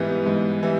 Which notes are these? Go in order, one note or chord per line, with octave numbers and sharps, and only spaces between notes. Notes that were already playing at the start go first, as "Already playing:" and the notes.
Already playing: G#2 E3 G3 B3
G#2
E3 G3